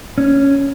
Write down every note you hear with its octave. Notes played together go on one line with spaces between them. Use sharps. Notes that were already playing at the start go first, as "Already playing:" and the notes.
C#4